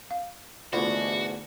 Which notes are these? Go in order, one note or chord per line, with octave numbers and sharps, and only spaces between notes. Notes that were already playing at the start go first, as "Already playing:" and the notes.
F5
D2 G#2 E3 B3 D4 F4 F#4